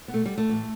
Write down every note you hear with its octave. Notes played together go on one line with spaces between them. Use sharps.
B3
B2 A3
G3
A3
A2 E3